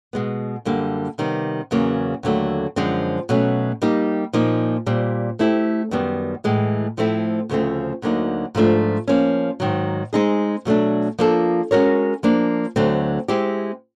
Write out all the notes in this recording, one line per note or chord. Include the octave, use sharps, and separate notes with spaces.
B2 G#3 B3
F#2 D3 G3 A#3
C3 D#3 G3 B3
E2 C#3 F#3 A#3
D#2 D3 F#3 A3
F#2 D3 F3 G#3 C4
B2 F#3 A3 C#4
G3 A#3 D#4 G4
A#2 F3 A#3 D#4
A#2 G3 C4
A3 C4 E4 G4
F#2 D#3 G3 B3
A2 E3 G#3
A2 F3 A3 C4 E4
D2 C#3 F3 A3 C4
D2 D3 F#3 A#3 D#4
G#2 F3 A3 D4 F4
F3 A#3 C#4
G#2 D#3 F#3
G#3 C4 D#4 G#4
B2 F#3 A3 D4
F3 A#3 D4 F4 A4
G#3 C#4 F#4 A#4 C#5
F3 A#3 D4
D2 D3 F#3 A3 C4
G#3 C4 E4 G4